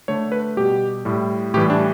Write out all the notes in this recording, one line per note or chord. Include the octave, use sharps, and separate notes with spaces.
D3 A3 C#5
B4
B2 G3 G4
A2 G3
A2 E3 G3 G4
D4